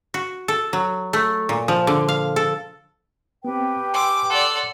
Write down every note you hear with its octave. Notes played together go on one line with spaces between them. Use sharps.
F#4
A4
F#3
A3
A#2
F3
D3
F5
A4
B3 C4 G4 B4 G5
G#5 C6 D6 E6
A4 D5 F#5 C6 F#6